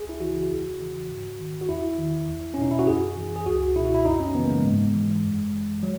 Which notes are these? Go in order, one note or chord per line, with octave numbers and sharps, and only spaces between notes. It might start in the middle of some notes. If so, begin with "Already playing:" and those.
Already playing: C#2 G#4
E4
C#3 E3 F#4
E2
C#3 E3
G#2
D#3
F#4
E2 E4
D#3
E2
C#4
B2 D#4
E4
F#4
F#2 G#4
E3
G#4
C#2 F#4
B2 E4
F#4
E4
F#2 D#4
C#4
C#3 E3 B3
A#3
G#3
G#2
E3
F#2
E3
F#3